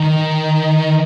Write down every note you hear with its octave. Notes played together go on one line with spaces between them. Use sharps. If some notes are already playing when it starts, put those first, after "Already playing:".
Already playing: D#3